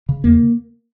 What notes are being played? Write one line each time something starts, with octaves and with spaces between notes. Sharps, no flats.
C#3
E2 A#3